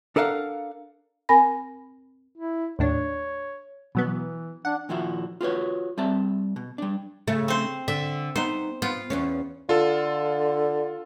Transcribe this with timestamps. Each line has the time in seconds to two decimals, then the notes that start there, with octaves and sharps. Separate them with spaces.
0.16 D4 A4 A#4 D#5 F5 F#5
1.29 C4 A#4 G#5 B5 A#6
2.36 E4
2.79 D#2 A2 D4 C#5
3.95 B2 E3 F#3 B3
4.65 D4 F#5
4.89 A#2 D#3 F3 E4 F#4
5.41 F4 F#4 B4 C#5
5.98 G3 C4 E5 A5
6.56 B2
6.78 G3 D4
7.27 C#3 A3
7.48 C4 C5
7.88 D3 E5
8.36 B3 D#4 C5
8.82 B3 F4
9.10 E2 B3 C#4
9.69 D3 F4 A4